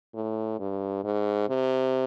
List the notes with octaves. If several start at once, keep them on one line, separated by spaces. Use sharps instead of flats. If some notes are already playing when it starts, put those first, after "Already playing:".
A2
G2
G#2
C3